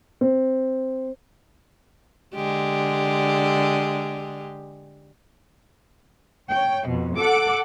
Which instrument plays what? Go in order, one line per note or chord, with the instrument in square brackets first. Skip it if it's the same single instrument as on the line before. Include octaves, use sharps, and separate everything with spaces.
[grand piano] C4
[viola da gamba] D3 G#3 G4
[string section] C#5 G5
F2 B2
A4 F#5 D6